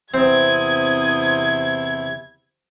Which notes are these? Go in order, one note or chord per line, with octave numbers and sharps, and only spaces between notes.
E2 C3 C4 E4 D#6 G#6